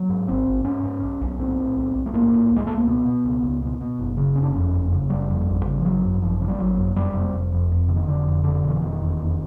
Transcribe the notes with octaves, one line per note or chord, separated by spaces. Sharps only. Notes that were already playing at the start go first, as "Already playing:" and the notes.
Already playing: F#3
G#2
G#1 C4
G#1
G#2 C#4
G#2
B1
B1
A2 C4
A2
B1
B1
A3
A2 A#3
A2
C#2
G#3
C#2 A3
A#3
B2 B3
B2
C#2
C#2
B2
B2
F#1
C#3
F#1 C#4
D4
F2 C#4
F#1
C#3
F#1 G3
F2
G#1
C#3
F3
G#1 F#3
F#2
G#1 F3
C#3
G3
G#1 F#3
F#2
F1 G3
C3
F1
F2
F1
C3
D#3
F1 D3
F2
F1 D3
B2
E3
F1 D#3
E2
F1